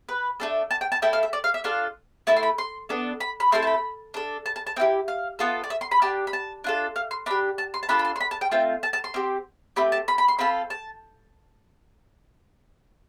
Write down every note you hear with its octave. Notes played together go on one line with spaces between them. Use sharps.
B4
A3 D4 A4
A5
G5
A5
A3 E4 A4 G5
F5
E5
D5
F5
E5
D4 F4 A4 F5
A3 E4 A4 A5
C6
B5
C6
B3 D4 A4
B5
B5
A3 C4 E4 A4 C6
A5
B5
D4 A4
A5
A5
A5
C4 E4 G4 G5
F5
B3 F4 A4
D5
E5
C6
B5
D4 G4 A5
B5
A5
D4 F4 A4
F5
C6
D4 G4 B5
A5
C6
A5
D4 F4 A4 B5
B5
C6
C6
B5
A5
G5
A3 C4 F4 G5
A5
A5
C6
C4 G4
A3 C4 G4 B5
A5
B5
B5
C6
C4 F4 A4 B5
A5